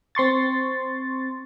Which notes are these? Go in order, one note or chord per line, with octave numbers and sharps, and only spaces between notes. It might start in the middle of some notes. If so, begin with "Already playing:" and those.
C4 C6 C#6 A6